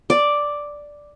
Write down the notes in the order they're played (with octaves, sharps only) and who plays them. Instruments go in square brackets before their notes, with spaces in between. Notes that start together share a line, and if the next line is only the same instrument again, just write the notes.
[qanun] D5